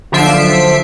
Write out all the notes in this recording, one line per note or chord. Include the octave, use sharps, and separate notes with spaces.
B1 D3 F3 E5 C7 D7